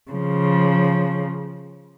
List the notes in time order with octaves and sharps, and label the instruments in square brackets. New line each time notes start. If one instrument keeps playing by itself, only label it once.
[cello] C#3 F3